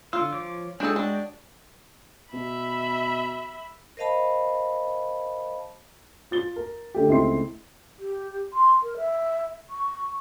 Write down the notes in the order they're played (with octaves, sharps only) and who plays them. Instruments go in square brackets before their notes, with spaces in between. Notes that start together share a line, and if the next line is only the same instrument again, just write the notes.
[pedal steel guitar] D3 E6 [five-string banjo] F4
[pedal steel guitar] F3 C#5 D6
[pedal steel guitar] G#3 F#4 G5 [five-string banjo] D4 G#4 A4
[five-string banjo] D4
[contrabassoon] B2 [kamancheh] E5 B5
[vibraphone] A#4 C5 D#5 F5 A5 B5
[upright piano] F4 A6 G7
A#4
D3 A3 G4
C#2 A3 C4 E4 C6 C7
[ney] G4
C6
A#4
E5
C#6